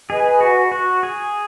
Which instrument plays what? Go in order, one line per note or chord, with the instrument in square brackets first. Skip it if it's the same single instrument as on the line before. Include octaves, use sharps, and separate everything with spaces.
[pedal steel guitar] G#4 [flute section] B4 D#5 G#5
[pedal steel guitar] F#4
F#4
G#4